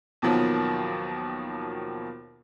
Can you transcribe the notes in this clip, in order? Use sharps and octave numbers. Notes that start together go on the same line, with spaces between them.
D#2 B2 D#3 F3 F#3 B3